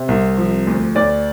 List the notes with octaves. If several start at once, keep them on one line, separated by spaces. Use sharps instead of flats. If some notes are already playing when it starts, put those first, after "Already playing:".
Already playing: C3
C2
F3
D2
D2 D5